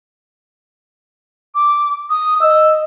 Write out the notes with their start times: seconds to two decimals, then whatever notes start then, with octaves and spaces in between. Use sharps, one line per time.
1.55 D6
2.10 D#6
2.41 D#5 E6